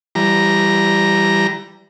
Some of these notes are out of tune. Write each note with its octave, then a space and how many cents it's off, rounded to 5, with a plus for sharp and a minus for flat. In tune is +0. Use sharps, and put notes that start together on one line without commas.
E3 +25 G3 +0 A#5 +0